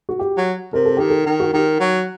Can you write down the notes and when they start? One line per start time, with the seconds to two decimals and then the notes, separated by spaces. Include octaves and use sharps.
0.09 F#4
0.19 G4
0.37 F#3
0.73 C3 A#4
0.85 A4
0.97 D#3 G4
1.10 A4
1.26 D#3
1.40 F#4
1.53 D#3 G4
1.80 F#3